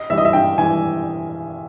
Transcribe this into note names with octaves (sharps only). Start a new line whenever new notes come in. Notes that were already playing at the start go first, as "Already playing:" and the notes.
Already playing: D#5
E3 G3 E5
D#5
E5
G2 G5
E3 G3 G#5